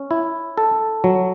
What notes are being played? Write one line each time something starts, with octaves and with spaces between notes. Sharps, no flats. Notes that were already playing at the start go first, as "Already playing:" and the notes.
Already playing: C#4
E4
A4
F#3